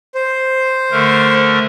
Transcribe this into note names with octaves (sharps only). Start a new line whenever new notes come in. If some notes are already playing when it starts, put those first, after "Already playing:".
C5
D3 A3 A#4